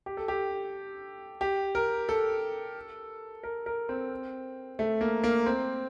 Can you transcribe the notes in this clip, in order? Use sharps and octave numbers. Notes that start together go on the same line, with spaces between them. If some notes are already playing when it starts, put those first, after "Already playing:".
G4
A4
G4
G4
A#4
A4
A#4
A#4
C4
A3
A#3
A#3
C4